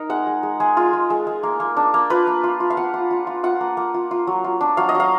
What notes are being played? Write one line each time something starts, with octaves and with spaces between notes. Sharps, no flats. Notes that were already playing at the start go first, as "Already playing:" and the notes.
Already playing: D#4 A#4
G#3 F#5
G#3
G#3
G#3 G#4
G#3 F4
G#3
G#3
G#3
A#3
A#3
D4
A#3
F4 B4
A#3
F4
F4
F5
F4 F#5
F4
F4
F4
F4 F#5
A#3
A#3
F4
F4
F#3
F4
D4
F#3 F5
D#5
F#3 F5